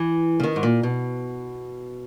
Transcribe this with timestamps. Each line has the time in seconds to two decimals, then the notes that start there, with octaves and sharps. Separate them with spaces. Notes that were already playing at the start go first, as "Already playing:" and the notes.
Already playing: E3
0.40 C#3
0.43 D#3
0.56 G#2
0.63 A#2
0.83 B2